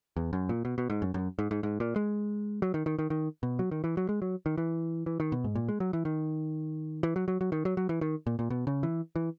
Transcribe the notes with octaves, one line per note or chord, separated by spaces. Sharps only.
E2
F#2
A#2
B2
B2
G#2
F#2
F#2
G#2
G#2
G#2
A#2
G#3
F#3
D#3
D#3
D#3
D#3
B2
F#3
D#3
E3
F#3
G#3
F#3
D#3
E3
E3
D#3
B2
G#2
A#2
G#3
F#3
E3
D#3
E3
F#3
F#3
F#3
D#3
F#3
F#3
E3
D#3
A#2
A#2
B2
C#3
E3
E3